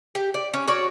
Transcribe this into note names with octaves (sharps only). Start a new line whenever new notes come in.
G4
D5
C#4
F#4 C#5 D5